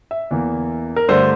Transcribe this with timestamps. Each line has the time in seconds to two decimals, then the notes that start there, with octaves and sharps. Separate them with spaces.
0.11 E5
0.31 E2 E3 A#3
0.96 A#4
1.09 G2 D3 A3 C5